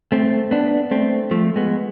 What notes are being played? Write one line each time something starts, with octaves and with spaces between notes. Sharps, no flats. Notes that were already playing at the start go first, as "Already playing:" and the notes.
A3 C4
B3 D4
A3 C4
F3 A3
G#3 B3